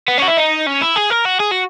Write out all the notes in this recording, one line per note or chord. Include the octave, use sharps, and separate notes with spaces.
B3
C#4 F#4
E4
D#4
C#4
E4
G#4
A#4
F#4
G#4
F#4